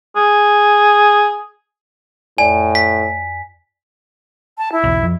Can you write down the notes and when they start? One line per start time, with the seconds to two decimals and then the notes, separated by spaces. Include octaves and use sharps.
0.16 G#4
2.38 F2 A2 D5 G#5
2.75 B6
4.58 A5
4.72 E4
4.84 B1 E2
5.03 F2